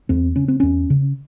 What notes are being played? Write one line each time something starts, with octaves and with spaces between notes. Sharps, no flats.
E2 C4
C#3 C#4
C4
E2 C#4
C#3